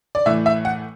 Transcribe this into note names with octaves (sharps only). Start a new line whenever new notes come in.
D5
A2 E3 A3 E5
E5
F#5